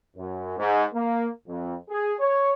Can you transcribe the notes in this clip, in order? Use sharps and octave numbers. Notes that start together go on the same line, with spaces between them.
F#2
G#2
A#3
F2
G#4
C#5